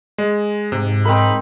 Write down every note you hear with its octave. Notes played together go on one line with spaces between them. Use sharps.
G#3
G#2 C3
C4 D#4 A#4 B5